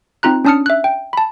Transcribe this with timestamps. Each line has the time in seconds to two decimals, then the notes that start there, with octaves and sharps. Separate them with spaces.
0.23 C4 D#4 F4 A#5 F#6
0.45 C#4 D4 A5 D#6 F6 C#7
0.66 E5 F#6
0.84 G5
1.13 A5 B5